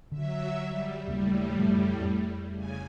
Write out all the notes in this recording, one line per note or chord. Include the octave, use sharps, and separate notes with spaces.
D3 F#3 E5
G3
D#2 A2 C#3 G3 A#3
F#2 C#3 F3
F2
C#3 G#5